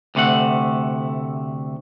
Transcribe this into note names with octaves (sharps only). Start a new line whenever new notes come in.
D2 C3 A3 F#5